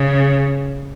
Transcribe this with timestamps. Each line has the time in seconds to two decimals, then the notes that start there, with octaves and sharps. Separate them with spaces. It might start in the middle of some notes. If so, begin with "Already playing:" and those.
Already playing: C#3